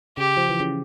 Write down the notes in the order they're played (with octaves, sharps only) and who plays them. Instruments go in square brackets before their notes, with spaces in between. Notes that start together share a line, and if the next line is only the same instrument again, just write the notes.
[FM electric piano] C#3 [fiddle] G4
[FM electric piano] F3
E3
C#3